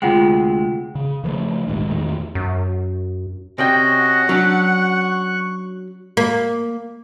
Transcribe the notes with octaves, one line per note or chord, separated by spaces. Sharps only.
D2 C3 G#3 F4 F#5 G5
C#3
C#3 E3 F3 A3
A#1 D#2 G#2
E2 A2 D#3
F#2
C3 C#4 F#4 D5 D#5 G5
F#5
F#3 C#4 D4 C#6 F#6
A#3